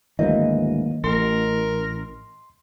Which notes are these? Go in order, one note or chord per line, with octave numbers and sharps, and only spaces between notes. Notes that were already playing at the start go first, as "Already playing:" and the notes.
D2 G#2 D#3 E3 F#3 A#3 D#5
A1 A#4 C6